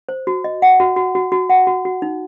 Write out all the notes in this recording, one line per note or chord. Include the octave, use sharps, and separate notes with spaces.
C5
F#4
D#5
F#5
F#4
F#4
F#4
F#4
F#5
F#4
F#4
D#4